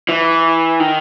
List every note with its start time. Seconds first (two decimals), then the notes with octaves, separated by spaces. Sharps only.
0.09 E3
0.80 D#3